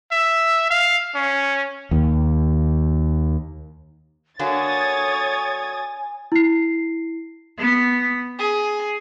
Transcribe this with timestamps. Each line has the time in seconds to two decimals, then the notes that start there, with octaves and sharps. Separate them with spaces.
0.12 E5
0.70 F5
1.15 C#4
1.91 D#2 D#3
4.39 D3 F#3 A#3 C#5 G#5 D#6 G#6 A6
6.32 E4 C7
7.58 B3
8.39 G#4